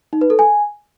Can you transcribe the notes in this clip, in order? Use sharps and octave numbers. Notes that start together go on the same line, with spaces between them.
D#4
B4
A4
G#5